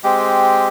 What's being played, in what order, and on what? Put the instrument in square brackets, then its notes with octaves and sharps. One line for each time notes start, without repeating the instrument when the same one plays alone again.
[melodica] G#3 C4 G4